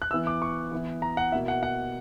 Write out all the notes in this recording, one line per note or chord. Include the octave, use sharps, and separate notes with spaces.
F#6
E3 B3 E4 E6
D6
C#6
E3 B3 E4
A#5
F#5
B2 A#3 E4 E5
F#5
F#5